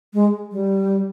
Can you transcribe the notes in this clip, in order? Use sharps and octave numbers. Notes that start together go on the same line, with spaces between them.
G#3
G3